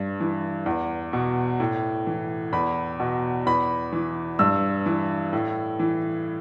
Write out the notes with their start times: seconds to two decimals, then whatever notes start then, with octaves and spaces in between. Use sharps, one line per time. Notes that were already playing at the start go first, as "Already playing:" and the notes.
Already playing: G2
0.20 E3
0.66 E2
1.13 B2
1.60 A2
2.07 E3
2.52 E2 B5
3.00 B2
3.46 E2 B5
3.92 E3
4.39 G2 E6
4.86 E3
5.33 A2
5.79 E3